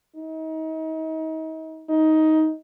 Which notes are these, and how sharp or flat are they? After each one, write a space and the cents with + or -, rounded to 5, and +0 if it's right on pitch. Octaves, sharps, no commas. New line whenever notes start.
D#4 +35
D#4 +15